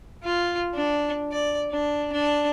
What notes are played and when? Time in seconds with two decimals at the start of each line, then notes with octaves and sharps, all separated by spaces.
0.23 F4
0.74 D4
1.32 D5
1.71 D4
2.13 D4